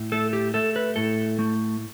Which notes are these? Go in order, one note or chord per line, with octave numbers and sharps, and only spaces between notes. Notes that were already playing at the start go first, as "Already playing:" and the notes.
Already playing: A2
A3 A4
G4
A3 A4
B4
A2 A4
A3